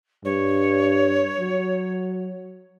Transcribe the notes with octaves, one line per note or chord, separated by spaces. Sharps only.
G2 C#5
F#3